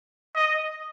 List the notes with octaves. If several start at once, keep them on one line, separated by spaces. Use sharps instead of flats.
D#5